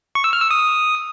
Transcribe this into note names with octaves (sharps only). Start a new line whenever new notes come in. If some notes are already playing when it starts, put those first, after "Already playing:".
C#6
E6
F6
E6
D#6